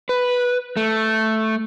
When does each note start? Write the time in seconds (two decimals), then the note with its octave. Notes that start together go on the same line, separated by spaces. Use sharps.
0.09 B4
0.77 A3